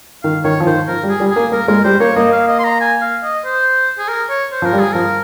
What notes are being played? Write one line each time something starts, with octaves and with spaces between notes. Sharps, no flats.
D#3 F5
D#3 C#5
F3
D#3 C5
F3 A#4
G3
G#4
G3
A#3 G#4
A#3 A#4
G#3 A#4
G3 C5
A#3 C#5
A#3 D#5
F5
D#5
C6
A#5
G#5
F5
D#5
C5
G#4
A#4
C#5
C5
F3 A#4
G3
G#4
F3 A#4